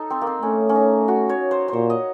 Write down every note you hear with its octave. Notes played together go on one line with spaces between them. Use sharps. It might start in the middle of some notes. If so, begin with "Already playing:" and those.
Already playing: D#4 A4
C4
A#3
C4
A3 C#4
C#4
D#4
F#4
C#5
C5
C5
A#2 C#5
D#5